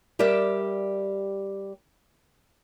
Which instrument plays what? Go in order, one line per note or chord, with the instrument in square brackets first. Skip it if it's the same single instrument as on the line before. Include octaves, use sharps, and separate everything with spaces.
[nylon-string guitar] G3 G4 A#4 D5 E5